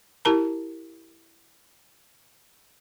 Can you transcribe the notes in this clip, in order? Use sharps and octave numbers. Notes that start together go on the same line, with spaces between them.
E4 G4 A#4 A5 A#5